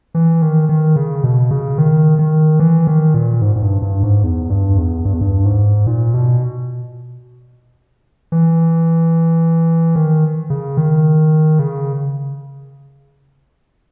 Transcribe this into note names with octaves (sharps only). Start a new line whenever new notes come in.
E3
D#3
D#3
C#3
B2
C#3
D#3
D#3
E3
D#3
A#2
G#2
G#2
G2
G2
G#2
E2
G2
E2
G2
E2
G2
G#2
A#2
B2
E3
D#3
C#3
D#3
C#3